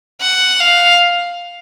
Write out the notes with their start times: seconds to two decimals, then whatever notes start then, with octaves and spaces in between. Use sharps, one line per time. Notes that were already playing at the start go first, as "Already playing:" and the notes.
0.21 F#5
0.60 F5